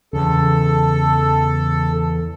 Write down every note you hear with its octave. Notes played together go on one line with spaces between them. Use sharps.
E2 C#3 A4